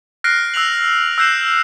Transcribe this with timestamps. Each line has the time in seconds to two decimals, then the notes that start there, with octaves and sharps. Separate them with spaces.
0.24 F6 F#6 A#6 C7 D7
0.54 E6 F#6 C7 F7 F#7
1.18 E6 F#6 G6 C7 E7